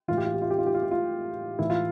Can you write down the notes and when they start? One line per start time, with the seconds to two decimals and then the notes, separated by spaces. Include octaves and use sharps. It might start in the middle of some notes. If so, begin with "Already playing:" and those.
0.08 A2 E3 F4
0.17 G4
0.25 F4
0.34 G4
0.42 F4
0.50 G4
0.59 F4
0.66 G4
0.74 F4
0.83 G4
0.91 F4
1.59 A2 E3 E4
1.70 F4